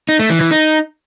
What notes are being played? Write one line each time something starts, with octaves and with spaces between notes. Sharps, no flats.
D#4
A3
E3
E3
D#4